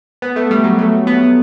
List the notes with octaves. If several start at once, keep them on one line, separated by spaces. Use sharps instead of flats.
B3
A3
G3
F#3
A3
B3